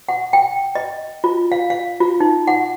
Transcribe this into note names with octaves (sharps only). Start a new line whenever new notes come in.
F#5
G5
D#5
F4
F5
F5
F4
D#4
F#5